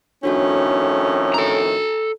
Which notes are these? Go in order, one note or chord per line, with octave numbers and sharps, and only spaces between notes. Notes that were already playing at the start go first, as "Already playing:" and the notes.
F2 A2 D#3 C#4 D4 F#4 C#5
A4 A#5